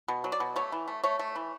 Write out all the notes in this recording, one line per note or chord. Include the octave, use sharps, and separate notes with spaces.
B2
F#3
D5
B2
A3 C#5
E3
A3
A3 C#5
A3
E3